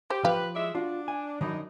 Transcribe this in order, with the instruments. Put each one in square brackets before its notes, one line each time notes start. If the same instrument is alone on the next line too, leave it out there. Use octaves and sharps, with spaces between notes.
[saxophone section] G4 [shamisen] C5
[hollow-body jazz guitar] F3 [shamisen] G4 F5 [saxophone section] B4
[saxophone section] G#3 D5 E5
[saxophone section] D4 [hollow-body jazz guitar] F4 F#4
[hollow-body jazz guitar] G#5
[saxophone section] F#2 D4 D#4 [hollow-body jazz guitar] D#3 F#3 B5